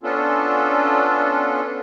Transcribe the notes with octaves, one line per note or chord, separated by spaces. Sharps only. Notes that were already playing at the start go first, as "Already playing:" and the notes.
B3 C#4 D4 F4 A4